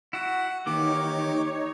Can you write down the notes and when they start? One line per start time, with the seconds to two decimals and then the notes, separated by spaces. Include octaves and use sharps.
0.13 E4 F#4 F#5
0.66 D#3 E3 A#3 D#4 G4 C#5 D6